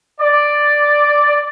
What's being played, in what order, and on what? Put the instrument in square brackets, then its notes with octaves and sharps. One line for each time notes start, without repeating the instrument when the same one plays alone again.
[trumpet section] D5